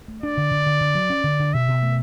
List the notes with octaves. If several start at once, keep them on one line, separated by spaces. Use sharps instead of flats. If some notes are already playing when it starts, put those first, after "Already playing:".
A3
D4 D5
D3
D3
D3
D3
F#3
C#4
D3
D3
B2 E5
B2
A3